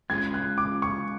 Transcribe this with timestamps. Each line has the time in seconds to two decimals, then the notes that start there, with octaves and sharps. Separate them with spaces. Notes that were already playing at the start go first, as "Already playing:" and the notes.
0.10 G#3 C#4 F4 G#4 C#5 G#6
0.34 F#6
0.58 D6
0.82 C#6